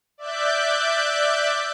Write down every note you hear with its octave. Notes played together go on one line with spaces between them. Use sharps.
D5 E5 D6 F#6 G6